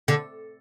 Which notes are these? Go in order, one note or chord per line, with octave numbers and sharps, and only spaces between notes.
D3